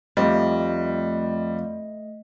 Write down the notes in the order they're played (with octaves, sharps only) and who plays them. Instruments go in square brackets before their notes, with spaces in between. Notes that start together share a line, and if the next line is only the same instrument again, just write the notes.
[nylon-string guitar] F2 [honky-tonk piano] G3 [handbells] A3 D#5